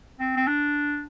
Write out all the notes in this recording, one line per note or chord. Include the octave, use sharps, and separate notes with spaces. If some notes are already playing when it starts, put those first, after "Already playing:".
C4
C4
D4